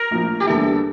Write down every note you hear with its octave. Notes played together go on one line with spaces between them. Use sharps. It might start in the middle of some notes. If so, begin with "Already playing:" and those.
Already playing: A#4
A#1 A2 F3
G4
E2 D3 G3 A#3 E4 A4